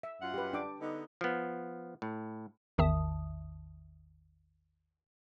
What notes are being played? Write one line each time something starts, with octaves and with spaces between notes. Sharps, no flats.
E5
F#2 F4 F#5
G4 B4
D4 G5 D6
D3 B3 D#4
F3 B3
A2
A1 E2 D#3 E5 A5 D#6